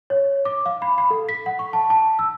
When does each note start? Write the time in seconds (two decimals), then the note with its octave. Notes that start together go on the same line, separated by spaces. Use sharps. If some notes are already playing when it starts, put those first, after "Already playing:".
0.10 C#5
0.45 D6
0.66 F5
0.82 B5
0.98 B5
1.11 A4
1.29 B6
1.46 F#5
1.59 C#6
1.73 A5
1.90 A5
2.19 E6